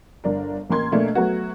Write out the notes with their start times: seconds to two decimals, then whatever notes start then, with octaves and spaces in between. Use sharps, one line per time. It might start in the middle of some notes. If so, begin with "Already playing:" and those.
0.24 G1 D4 A#4
0.70 A1 A#3 A#4 C6 G#6
0.92 B2 A3 A#3 D4
1.15 F#3 A3 B3 F#4